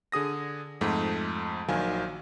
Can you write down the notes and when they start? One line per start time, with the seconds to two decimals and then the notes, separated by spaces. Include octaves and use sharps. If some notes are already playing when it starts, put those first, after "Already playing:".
0.12 D3 G#4 D#6 A#6
0.81 F2 G#2 A3
1.68 A#1 D#3 F#3 F5 G#5